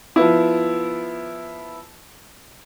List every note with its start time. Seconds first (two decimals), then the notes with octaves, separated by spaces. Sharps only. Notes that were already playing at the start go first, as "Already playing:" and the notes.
0.16 F3 B3 E4